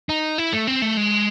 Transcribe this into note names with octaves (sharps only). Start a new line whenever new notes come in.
D#4
E4
A3
C4
A3
G#3